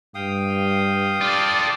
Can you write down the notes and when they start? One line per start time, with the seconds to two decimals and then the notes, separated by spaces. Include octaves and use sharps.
0.15 G2 F5 G5 D#6
1.21 F4 A4 D5